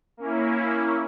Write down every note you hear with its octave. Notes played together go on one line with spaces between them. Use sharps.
A#3 C#4 E4